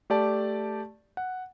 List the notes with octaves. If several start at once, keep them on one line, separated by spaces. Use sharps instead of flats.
A3 G4 D5 A5
F#5